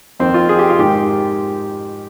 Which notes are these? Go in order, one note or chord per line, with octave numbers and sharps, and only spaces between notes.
F2 D#3 C4
F4
G#4
G4
F4
G#2 D#3 G4